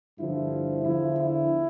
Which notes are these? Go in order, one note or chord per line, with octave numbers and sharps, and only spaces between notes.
G2 D3 F3 E4
E2 D3 F3 E4
E4